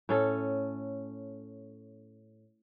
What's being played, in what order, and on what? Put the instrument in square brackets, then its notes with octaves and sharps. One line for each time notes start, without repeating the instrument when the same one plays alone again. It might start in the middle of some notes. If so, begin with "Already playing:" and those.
[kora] A2 C#4 A4